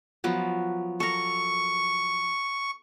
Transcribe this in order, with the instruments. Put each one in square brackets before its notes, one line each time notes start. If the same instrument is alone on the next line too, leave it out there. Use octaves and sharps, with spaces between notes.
[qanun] F3 F#3 B3
[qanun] A4 A#4 [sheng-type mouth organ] C#6